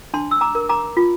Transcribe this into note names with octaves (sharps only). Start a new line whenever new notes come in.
D4 A5 C6
E6
A#5 D6
A#4
A#5 D6
F4